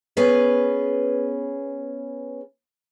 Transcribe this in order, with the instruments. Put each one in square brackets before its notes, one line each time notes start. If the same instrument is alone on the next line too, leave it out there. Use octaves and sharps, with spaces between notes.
[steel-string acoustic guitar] B3 C#4 G#4 B4